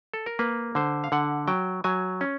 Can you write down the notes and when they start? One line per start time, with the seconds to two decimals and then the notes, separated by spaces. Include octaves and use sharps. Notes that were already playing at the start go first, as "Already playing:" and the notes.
0.14 A4
0.26 A#4
0.39 A#3 B4
0.75 D3 C5
1.04 F5
1.12 D3 F#5
1.47 F#3 G5
1.84 F#3 G#5
2.21 C#4